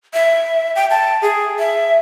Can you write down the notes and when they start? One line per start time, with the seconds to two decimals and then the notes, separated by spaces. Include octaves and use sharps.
0.14 E5
0.76 G5
0.90 A5
1.22 G#4
1.59 E5